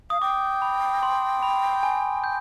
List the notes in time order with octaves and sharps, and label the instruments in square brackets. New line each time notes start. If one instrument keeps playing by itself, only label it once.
[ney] F5 [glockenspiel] D#6
[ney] G5 [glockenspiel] D6
[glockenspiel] B5
C6
B5
G#5
G6